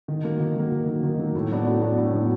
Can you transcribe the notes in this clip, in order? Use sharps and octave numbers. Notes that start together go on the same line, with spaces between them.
D#3
F#3 A#3
D#3
F#3 A#3
D#3
F#3 A#3
D#3
F#3 A#3
A2
F#3 B3 D4 F#4
A2
F#3 B3 D4 F#4
A2
F#3 B3 D4 F#4